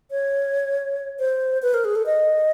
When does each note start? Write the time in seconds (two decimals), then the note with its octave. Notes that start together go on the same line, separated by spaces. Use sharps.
0.11 C#5
1.19 C5
1.62 B4
1.74 A#4
1.84 G#4
1.95 A4
2.06 D#5